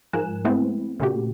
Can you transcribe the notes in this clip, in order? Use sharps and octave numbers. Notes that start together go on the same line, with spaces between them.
G#2 F3 A#4 G#5 F#6 E7
G#3 A3 B3 C4 E4
A#2 C#3 A3 F#4 G4